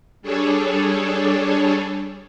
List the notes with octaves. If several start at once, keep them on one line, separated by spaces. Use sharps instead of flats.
G3 D4 G#4 A4 C#5